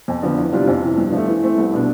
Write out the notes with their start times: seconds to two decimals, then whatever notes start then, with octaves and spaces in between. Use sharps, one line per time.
0.08 F2
0.23 D3 F3 B3
0.38 E2
0.52 C3 G3 D4 F4
0.67 F2
0.82 C3 E3
0.98 G2
1.12 F3 A3
1.28 E3
1.43 A3 C4
1.58 C2
1.73 B2 B3 D4